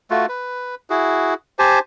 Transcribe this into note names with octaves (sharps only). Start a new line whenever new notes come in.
A3 F4 F#4
B4
E4 F#4 G#4
G4 C5 G#5 A5